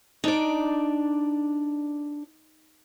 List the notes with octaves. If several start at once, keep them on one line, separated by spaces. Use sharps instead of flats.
D4 D#4 D5